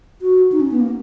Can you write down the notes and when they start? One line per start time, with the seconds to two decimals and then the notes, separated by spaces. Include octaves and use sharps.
0.22 F#4
0.52 D#4
0.61 C#4
0.71 B3
0.81 A#3